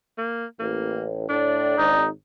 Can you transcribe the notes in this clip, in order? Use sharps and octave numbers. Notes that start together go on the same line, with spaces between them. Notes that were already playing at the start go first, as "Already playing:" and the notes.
A#3
A1 A#3
A2 D4 D5
G#1 D#4